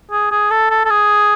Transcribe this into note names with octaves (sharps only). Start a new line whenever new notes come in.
G#4
G#4
A4
A4
A4
G#4